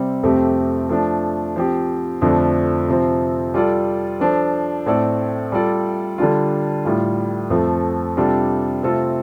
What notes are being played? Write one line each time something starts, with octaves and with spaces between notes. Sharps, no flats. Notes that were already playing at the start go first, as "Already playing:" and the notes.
Already playing: C3 G3 C4
F2 C3 A3 C4 G4
F3 A3 D4
F3 C4 G4
F2 D3 F3 A3 D4
C3 F3 C4
G3 F4 A4 D5
F3 D4 A4 C5
A2 A3 C4 A4 D5
G3 F4 A4 D5
D3 G3 D4 F4
A2 G3 F4
F2 F3 A3
C3 G3 D4 F4 A4
C3 A3 C4 F4 A4